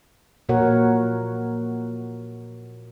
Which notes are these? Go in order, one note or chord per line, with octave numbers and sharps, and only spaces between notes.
A#2 F#4 A#4 C#5 F#5